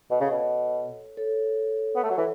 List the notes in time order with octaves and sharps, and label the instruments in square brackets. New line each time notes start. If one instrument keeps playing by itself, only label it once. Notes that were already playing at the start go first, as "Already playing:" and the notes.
[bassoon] B2 [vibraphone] A4 C#5
[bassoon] C#3
B2
[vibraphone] A4 C#5
[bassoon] B3
A3
F#3
E3